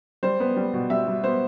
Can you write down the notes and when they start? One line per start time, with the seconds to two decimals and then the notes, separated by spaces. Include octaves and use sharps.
0.23 G3 C5
0.40 B3
0.56 G3
0.73 B2
0.90 G3 E5
1.07 G3
1.24 B3 C5